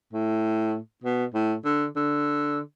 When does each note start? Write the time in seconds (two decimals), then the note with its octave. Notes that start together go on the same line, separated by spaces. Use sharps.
0.13 A2
1.04 B2
1.34 A2
1.65 D3
1.96 D3